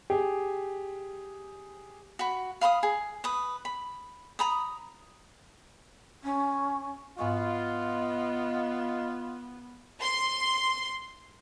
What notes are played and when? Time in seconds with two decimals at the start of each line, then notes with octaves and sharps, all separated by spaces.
0.10 G4 G#4
2.19 F#4 B5
2.61 F5 B5 C6 D#6
2.83 G#4
3.24 B4 D#6
3.65 B5
4.39 A#5 B5 D#6
6.24 C#4
7.18 G#2 B3 F4 D#5 G#5 C#6
10.01 C6